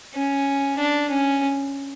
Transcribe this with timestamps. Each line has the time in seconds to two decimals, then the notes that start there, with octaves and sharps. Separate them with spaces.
0.14 C#4
0.79 D4
1.10 C#4